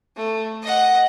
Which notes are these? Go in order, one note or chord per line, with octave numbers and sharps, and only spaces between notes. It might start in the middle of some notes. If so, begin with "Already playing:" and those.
A3
D#5 F#5